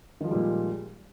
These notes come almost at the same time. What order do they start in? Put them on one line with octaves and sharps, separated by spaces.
D#3 F3 G#3 G3 A#2